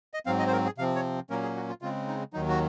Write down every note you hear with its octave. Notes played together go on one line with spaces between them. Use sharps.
D#5
G#2 F#3 C4 F5
D#5
C5
A#4
G#4
C3 F3 C4 F5
C#5
A#2 F#3 A#3 C#4 A#4
G#4
F#4
F4
C#3 G#3 C4 F4
D#4
D#2 D#3 F#3 D#4
F#4